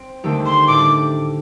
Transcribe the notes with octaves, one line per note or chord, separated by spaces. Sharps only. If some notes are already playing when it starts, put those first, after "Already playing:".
Already playing: C4
D#2 D3 A3 C4 G4
C6
A2 A3 D4 G4 D6